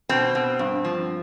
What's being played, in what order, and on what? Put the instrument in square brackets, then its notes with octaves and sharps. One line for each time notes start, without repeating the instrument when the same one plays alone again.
[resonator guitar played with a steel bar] B2 C4
B2
G2
F3